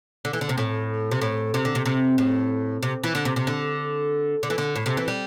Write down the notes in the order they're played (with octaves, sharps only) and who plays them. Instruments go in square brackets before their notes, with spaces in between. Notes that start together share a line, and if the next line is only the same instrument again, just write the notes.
[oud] D3
E3
D3
C3
A2
C3
A2
C3
D3
C3
C3
A2
C3
E3
D3
C3
C3
D3
D3
E3
D3
A2
C3
E3
G3